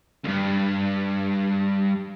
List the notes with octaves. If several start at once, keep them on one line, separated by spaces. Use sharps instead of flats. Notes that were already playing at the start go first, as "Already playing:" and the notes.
C#2 G2